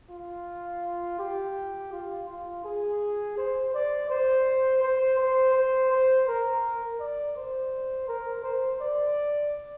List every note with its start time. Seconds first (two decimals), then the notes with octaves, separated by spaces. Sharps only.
0.11 F4
1.19 G4
1.92 F4
2.29 F4
2.65 G#4
3.38 C5
3.74 D5
4.10 C5
4.83 C5
5.19 C5
5.54 C5
5.91 C5
6.28 A#4
7.00 D5
7.36 C5
8.08 A#4
8.44 C5
8.80 D5